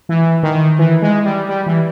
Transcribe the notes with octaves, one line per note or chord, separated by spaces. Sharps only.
E3
D#3
E3
G#3
G3
G3
E3